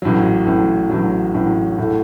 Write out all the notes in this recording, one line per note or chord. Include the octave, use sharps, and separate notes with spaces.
A1 A2 F#3
A1 A2 F#3
A1 A2 F#3
A1 A2 F#3
A2 A3 F#4